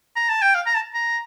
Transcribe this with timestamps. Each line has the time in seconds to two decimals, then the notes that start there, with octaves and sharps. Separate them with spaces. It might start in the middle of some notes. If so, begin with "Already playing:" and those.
0.16 A#5
0.29 A5
0.42 G5
0.55 F5
0.66 A#5
0.75 A5
0.94 A#5